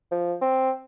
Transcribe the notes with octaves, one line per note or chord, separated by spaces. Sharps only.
F3
C4